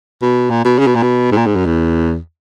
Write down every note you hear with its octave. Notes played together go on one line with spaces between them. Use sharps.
B2
A#2
B2
C#3
B2
A#2
B2
G#2
A#2
G#2
F#2
E2